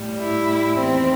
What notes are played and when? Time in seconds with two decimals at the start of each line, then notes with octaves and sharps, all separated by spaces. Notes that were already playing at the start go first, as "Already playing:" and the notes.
Already playing: A2 G3
0.19 E4
0.79 E2 D#3 G3 C4